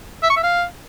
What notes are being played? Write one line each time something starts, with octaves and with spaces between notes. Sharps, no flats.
E5
C#6
E5
F5